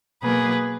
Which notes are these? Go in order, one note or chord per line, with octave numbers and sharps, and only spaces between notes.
B2 F#3 A#3 G#4 B4